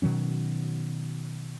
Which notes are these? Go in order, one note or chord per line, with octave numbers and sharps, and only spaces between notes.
B2 D#3 F#3 C#4